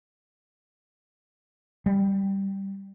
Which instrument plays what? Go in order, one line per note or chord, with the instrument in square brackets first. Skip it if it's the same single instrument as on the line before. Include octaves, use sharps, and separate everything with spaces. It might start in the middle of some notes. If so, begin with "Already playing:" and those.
[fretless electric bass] G3